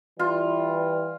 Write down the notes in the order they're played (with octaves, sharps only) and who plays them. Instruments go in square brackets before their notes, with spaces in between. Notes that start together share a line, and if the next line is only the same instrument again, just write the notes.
[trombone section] E3 G3 [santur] F4